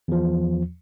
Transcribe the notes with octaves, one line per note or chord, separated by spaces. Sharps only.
E2 F3